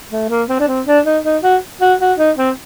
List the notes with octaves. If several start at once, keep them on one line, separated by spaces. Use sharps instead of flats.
A3
A#3
C4
D4
C4
D4
D#4
D#4
F#4
F#4
F#4
D#4
C4